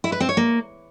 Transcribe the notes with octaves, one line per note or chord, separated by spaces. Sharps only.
E4
B4
C4
C#5
A#3